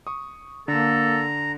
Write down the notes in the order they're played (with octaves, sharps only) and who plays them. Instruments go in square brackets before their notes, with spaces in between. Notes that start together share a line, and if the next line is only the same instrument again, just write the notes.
[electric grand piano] C#6 D#6
[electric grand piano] D3 [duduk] A#3 [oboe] A4 [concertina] A#5